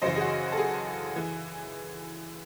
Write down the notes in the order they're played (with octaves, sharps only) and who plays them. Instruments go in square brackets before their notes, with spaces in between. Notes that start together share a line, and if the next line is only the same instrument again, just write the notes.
[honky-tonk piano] F#2 C#3 E3 C5 D#5
G#4
F#4
A4
G#4
E3